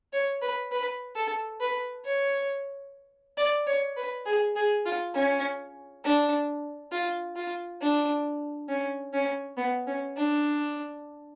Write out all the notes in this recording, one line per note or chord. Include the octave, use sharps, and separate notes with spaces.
C#5
B4
B4
A4
B4
C#5
D5
C#5
B4
G#4
G#4
F4
C#4
D4
F4
F4
D4
C#4
C#4
B3
C#4
D4